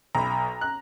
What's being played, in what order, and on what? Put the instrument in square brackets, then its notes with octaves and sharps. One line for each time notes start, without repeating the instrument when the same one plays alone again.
[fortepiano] B1 B5 [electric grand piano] A#5
[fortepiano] F#6